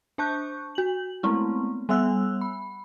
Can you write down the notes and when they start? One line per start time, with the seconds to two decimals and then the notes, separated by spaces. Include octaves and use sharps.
0.18 D4 C5 A5 C#6 F#6 G6
0.75 F#4 F#7
1.23 G#3 A3 B3 C4 E4
1.89 G3 B3 E5 F#5 E6 F#6
2.41 B5